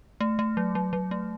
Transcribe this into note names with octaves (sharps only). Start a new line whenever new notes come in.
A3
A3
F#3
F#3
F#3
A3